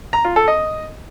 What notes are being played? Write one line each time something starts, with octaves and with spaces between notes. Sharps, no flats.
A#5
F4
A4
D#5